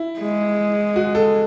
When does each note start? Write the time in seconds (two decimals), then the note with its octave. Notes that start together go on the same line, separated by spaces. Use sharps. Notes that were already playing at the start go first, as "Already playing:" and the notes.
Already playing: E4
0.20 G#3
0.96 F#4
1.15 A4